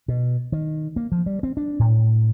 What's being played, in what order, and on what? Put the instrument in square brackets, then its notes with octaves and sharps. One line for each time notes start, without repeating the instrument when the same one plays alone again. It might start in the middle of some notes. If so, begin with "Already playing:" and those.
[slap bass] B2
D#3
A#3
F3
G3
C4
D4
A2